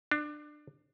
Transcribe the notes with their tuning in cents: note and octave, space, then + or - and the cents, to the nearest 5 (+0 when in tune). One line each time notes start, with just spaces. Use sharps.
D4 +25